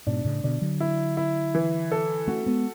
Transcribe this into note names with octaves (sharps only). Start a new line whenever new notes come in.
G#2 B2 D4
A2 C#3
B2 D3 D5
D3 F#3
E4
E4
E3
A4
A3 C#4 F#4
G#3 B3